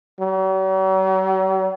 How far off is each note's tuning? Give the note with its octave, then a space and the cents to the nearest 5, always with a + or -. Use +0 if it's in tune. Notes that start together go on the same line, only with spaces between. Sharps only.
F#3 +45